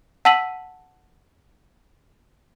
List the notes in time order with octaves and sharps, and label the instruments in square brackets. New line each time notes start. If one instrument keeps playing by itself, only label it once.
[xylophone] F#5 A5 E6 B6 D#7 F#7